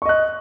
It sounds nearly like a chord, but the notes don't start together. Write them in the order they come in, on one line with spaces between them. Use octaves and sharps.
C#6 D#5 F#6